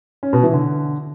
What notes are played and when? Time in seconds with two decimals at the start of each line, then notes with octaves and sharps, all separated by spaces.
0.23 C#4
0.33 B2
0.43 E3
0.53 D3